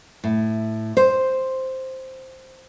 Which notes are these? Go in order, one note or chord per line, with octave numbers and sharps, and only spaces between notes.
A2
C5